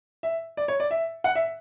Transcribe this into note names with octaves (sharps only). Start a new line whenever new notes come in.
E5
D5
C#5
D5
E5
F#5
E5